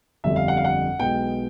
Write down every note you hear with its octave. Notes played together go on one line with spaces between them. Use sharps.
G1 F2 D3 G3 E5
F5
F#5
F5
F#5
B1 B2 G#3 B3 G5